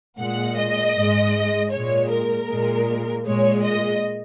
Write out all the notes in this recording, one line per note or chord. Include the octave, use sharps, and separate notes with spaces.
A#2 G#3 F#5
D#5
G#2 G#3
A#2 G#3 C#5
A#4
A#2 G#3
A#2 G#3 C#5
D#5